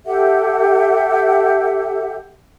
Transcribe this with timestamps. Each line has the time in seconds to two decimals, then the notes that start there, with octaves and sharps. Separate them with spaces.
0.06 G4 A4 E5 F#5